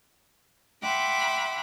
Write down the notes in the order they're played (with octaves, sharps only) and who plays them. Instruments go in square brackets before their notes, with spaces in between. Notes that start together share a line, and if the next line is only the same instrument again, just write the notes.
[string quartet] E5 F#5 G5 B5 C6 D6